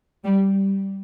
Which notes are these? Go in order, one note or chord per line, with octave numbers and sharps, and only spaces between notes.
G3